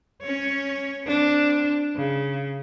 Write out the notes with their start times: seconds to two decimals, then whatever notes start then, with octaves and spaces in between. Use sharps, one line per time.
0.22 C#4 C#5
1.04 C4 D4
1.96 C#3